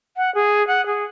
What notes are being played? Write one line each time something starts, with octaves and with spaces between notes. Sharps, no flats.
F#5
G#4
F#5
G#4